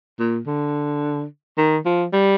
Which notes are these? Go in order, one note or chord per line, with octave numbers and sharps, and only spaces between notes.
A#2
D3
D#3
F3
G3